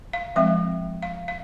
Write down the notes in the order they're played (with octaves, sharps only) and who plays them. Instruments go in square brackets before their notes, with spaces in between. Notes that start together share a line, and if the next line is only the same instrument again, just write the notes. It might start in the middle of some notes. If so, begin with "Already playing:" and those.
[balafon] F5
F3 G#3 C4 E5
F5
F5